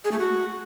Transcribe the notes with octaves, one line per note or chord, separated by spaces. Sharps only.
G#4
A3
F#4